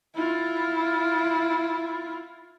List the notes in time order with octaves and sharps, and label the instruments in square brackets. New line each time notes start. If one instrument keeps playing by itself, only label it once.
[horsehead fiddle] E4 F4